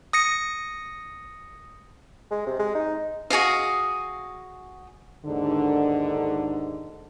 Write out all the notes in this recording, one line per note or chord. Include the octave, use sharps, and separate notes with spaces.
D#6 A#6 C#7
G#3
C3
G#3
D#4
F#4 G#4 D#5 F5
D#2 G#2 D3